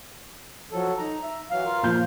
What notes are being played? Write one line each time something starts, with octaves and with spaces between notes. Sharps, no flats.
F3 F#3 A4
D#4 A#5
E5
E3 F#3 F5
F4 A#4
A#2 F3 G6